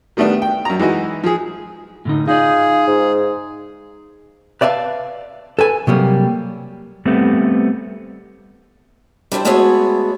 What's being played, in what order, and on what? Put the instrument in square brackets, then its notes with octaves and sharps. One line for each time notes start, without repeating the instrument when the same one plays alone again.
[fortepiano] D#3 G3 A3 B3 D4
G5
F#2 A#5
E3 G#3 D#4 F#4
F3 G#4
[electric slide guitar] A2 D3 D#4
[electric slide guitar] D#4 D5 [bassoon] F4 [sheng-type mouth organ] G#4
[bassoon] G#2
[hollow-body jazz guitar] B4 D5 E5 F5 A5
A4 B4 G#5
C3 F#3 G3 A#3
[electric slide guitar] G3 A3 B3 C4
[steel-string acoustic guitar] G3 D4 E4 C5 E5
G#3 A3 B3 F#4 G#4 C#5